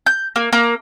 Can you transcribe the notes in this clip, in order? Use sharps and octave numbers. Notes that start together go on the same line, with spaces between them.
G6
A#3
A#3